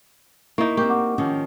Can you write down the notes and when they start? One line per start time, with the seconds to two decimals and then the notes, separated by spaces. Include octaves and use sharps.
0.58 A#3 D#4 E4 C#6
0.77 A#3 C4 G4 C#6 D6
0.90 F#5 C#6 D6
1.18 D#3 F3 C#4